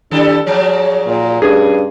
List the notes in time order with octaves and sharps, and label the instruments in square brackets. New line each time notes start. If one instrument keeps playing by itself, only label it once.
[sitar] D#3 G3 A4 [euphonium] D4
[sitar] G#2 F3 F#3 [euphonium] G#4 [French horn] C#5
[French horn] A#2
[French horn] G2 [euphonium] C#3 [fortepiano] G#4